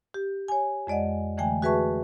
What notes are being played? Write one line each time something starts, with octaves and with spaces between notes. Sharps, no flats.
G4
C#5 G#5
F2 G#3 D5 D#5 F#5
D3 E3 A3 G5 G#5
F#4 G#4 B4 E5 A5 C#6